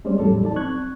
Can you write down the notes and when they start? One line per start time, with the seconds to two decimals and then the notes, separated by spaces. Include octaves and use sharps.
0.05 G3 G#3 C4 C#4 C5 D5
0.20 E2 A2 E3 F#3 G3 A4
0.44 D#4 D5 A5
0.56 C4 C#6 F#6 G#6